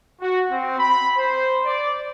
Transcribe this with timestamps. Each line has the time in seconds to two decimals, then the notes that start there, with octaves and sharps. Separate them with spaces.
0.21 F#4
0.50 C4
0.79 B5
1.16 C5
1.65 D5